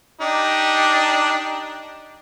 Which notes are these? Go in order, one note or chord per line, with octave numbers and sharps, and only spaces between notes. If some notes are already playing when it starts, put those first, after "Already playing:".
D4 D#4 G4